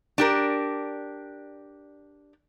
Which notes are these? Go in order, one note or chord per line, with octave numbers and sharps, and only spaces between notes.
D4 G4 A#4